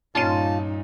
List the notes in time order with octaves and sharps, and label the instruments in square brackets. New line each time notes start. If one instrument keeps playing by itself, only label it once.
[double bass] G2 D#4 [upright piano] A#2 C#4 D#7 [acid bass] F4 [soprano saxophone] A5